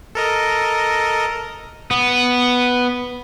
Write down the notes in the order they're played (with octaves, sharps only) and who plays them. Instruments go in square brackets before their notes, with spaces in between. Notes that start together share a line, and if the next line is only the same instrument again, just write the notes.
[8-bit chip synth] A4 A#4 D#5
[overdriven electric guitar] B3